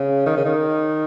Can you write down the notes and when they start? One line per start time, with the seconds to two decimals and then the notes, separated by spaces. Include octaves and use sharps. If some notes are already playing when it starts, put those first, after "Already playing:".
Already playing: C#3
0.26 D#3
0.37 C#3
0.45 D#3